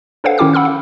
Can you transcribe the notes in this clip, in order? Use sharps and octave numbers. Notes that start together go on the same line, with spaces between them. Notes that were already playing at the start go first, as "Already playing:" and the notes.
D4 A4 B4 C5 F5 F#5
D#3 C#4 E4 G5 D6 F6
F#5 B5 E6 F6
F5